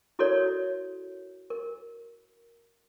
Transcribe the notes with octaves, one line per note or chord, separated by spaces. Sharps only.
E4 F#4 A4 A#4 C#5 D5
A#4